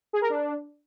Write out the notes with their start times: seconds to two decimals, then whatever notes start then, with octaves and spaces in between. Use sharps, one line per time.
0.13 G#4
0.21 A#4
0.30 D4